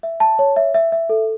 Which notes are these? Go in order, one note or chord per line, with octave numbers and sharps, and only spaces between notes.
E5
A5
C#5
E5
E5
E5
A4